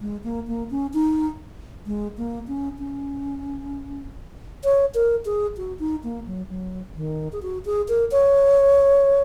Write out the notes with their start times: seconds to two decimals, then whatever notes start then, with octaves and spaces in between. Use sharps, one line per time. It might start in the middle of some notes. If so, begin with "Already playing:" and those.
0.01 G#3
0.24 A#3
0.47 A#3
0.71 C#4
0.94 D#4
1.86 G#3
2.18 A#3
2.48 C#4
2.79 C#4
4.64 C#5
4.94 A#4
5.25 G#4
5.57 F#4
5.79 D#4
6.04 A#3
6.27 F#3
6.50 F#3
6.96 D#3
7.33 G#4
7.42 F#4
7.66 G#4
7.89 A#4
8.11 C#5